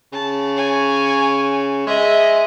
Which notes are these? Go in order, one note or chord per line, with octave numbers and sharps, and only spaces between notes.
C#3 A5
C#5 G#5
G#3 D#5 E5